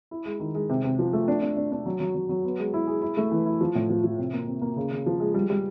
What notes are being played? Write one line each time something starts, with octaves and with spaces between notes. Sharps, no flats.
E4
G#3
D#3
G#3
C3
C3
F3
A3
D4
D4
D4
D4
F#3
F#3
F#3
F#3
B3
G#3
E4
G#4
E4
A3
E3
E4
F3
A2
F3
F3
C3
A#3
C3
A#3
C#3
C#3
F3
G#3
G3
G3